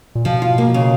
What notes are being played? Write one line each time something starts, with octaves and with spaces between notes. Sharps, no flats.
A#2
B2 F3
F4
A#3
C#3